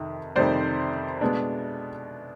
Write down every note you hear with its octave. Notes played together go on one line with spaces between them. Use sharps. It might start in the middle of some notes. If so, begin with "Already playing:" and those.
Already playing: F2 C3 D#3
F2 C3 D#3 G3 C5 D5
B2 G#3 B3 D4